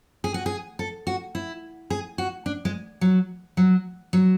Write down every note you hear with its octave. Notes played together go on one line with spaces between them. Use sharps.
G#4
F#4
G#4
A4
F#4
E4
G#4
F#4
D4
G#3
F#3
F#3
F#3